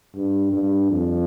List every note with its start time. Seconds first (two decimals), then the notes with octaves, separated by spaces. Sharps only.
0.15 G2
0.53 G2
0.91 F2